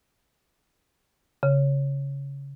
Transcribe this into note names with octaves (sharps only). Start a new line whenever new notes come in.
C#3